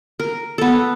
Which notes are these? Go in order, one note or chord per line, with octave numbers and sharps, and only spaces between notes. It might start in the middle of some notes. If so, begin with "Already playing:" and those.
A#4
B3 A4